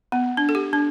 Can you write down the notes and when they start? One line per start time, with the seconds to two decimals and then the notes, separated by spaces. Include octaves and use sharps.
0.12 B3
0.37 D4
0.49 A4
0.55 G4
0.73 D4